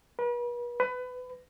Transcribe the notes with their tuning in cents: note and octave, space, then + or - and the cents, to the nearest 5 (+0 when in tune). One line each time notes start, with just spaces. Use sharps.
B4 -40
B4 +25